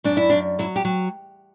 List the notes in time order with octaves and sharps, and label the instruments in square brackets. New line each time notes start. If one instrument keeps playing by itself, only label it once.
[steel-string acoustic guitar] F#2 D4
E4
F#2 D4
F#3 E4
G4
F#3